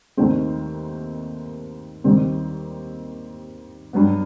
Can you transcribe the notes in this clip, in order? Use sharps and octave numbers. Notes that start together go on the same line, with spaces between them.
D#2 D#3 A3 C4
D#2 D#3 G3 C4
G2 F#3 B3